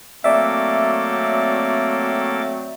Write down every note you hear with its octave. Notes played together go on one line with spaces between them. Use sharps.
F#3 A3 A#3 C4 A4 D5 E5 D6